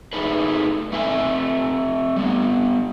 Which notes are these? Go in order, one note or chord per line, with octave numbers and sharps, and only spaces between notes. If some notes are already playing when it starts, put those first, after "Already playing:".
A3 D#4 G#4 B4
A3 C4 E5 G#5
G3 B3